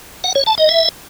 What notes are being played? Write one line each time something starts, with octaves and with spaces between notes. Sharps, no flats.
F#5
C#5
A5
D#5
E5